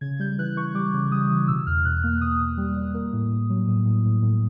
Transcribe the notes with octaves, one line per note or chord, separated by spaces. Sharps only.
C#3 G#6
G3 G6
E3 F#6
E3 C#6
G3 D6
C#3
G3 D#6
E3
B2 E6
E2 F6
B2 F#6
A#3 F6
B2 D#6
B2
G3
G3
A#3
A2
A2
F#3
A2
A2
A2
A2